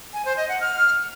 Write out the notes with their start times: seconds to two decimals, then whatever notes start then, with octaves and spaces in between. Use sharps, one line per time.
0.13 G#5
0.25 C5
0.37 D#5
0.49 F#5
0.61 F6